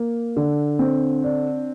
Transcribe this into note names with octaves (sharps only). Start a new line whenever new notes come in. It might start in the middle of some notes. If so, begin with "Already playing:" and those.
Already playing: A#3
D3
C4
D4